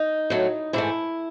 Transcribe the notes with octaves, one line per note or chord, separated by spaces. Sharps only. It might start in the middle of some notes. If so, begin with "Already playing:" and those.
Already playing: D#4
A2 F#3 A3
G#2 E3 A3 E4